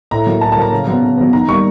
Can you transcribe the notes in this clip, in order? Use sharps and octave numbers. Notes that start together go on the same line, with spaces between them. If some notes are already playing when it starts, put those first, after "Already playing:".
A2 A#5
F#3 A#3
A2 A5
A5
F#3 A#3 A#5
C#3
F#3 B3
C#3
F#3 B3
D#3 A#5
G3 A#3 C#6